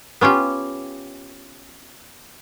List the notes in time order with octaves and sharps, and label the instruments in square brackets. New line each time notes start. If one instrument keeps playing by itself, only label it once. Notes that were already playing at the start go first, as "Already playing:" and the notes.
[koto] B3 C#4 F4 G4